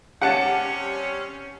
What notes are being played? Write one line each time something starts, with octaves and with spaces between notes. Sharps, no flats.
C3 G3 C#4 G4 F#5 A5 C#7 E7